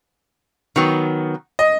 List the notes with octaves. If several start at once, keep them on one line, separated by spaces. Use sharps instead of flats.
D#3 F#3 B3
D#5